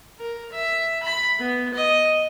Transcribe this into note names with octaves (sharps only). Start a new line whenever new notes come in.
A#4
E5
B5
B3
D#5